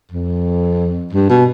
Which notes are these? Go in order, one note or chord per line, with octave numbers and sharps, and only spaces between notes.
F2
G2
B2